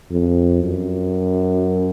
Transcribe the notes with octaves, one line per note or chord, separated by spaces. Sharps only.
F2
F#2